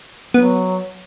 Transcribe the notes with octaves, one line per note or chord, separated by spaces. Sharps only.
F#3 B3